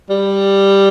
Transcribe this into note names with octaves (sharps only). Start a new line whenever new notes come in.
G3